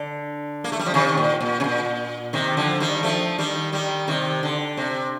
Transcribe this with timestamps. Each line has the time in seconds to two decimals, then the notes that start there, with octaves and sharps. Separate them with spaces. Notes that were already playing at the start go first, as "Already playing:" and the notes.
Already playing: D3
0.64 A#3
0.72 A3
0.79 G3
0.86 F3
0.94 C3 D#3
1.17 A#2
1.41 A#2
1.60 C3
1.64 A#2
2.33 C3 D#3
2.57 D3 F3
2.80 D#3 G3
3.03 F3 A3
3.38 D#3 G3
3.73 D#3 G3
4.08 C3 D#3
4.43 D3
4.77 C3